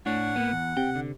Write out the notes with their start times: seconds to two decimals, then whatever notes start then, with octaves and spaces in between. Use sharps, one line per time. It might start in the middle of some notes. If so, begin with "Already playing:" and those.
0.06 A2 D4 C#5 F#5
0.36 A#3 B3
0.52 E2
0.77 C3 G5
0.96 D3